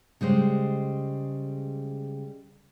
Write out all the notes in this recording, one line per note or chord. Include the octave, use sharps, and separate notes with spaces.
C#3 G3 G#3 C5